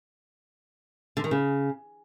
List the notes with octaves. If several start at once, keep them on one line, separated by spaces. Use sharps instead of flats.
D3
D#3
C#3